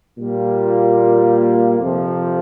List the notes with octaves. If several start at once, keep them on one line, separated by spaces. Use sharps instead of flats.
A#2 G3 A#3 F4
F2 C3 F3